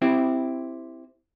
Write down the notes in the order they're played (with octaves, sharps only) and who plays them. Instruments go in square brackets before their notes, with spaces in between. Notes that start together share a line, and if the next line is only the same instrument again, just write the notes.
[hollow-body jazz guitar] C4 E4 G4